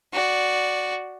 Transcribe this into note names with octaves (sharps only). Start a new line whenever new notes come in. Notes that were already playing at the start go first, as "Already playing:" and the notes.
F#4 D5